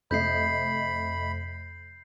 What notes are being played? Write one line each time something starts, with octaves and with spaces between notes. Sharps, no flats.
F2 C3 A3 D#5 B5 G6 C7